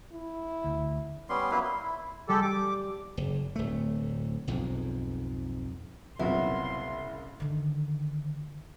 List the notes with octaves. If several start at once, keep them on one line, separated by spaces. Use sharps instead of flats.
E4
D2
G3 B3 C#4 C6
F#3 A#3 E4 B4
C6
E4
G3 G#3 G4 A4
D6
F#1
D1 A3
B1 F2 G#2
F#1 C2 A#2 F#3 B3 E4 C6
D3 D#3